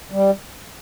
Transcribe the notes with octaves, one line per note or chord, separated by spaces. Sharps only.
G3